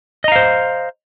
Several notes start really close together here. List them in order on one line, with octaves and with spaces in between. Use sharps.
D#5 A#5 F5 C5